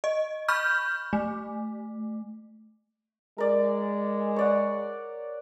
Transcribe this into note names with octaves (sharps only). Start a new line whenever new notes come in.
D#5
B5 C#6 F6 G6
A3
G#3 A#4 D5
C#5 D5 F#5